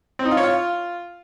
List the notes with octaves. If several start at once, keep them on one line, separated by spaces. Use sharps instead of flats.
C4
D#4
F4
C#5
F4